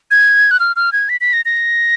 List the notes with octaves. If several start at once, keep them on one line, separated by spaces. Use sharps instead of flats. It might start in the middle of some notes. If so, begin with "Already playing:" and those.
G#6
F#6
F6
F6
G#6
B6
B6
A#6
A#6